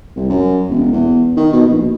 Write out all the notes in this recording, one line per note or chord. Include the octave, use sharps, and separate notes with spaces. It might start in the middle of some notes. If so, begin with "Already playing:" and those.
C2
F#2
E1
E2
D#3
B2
A#1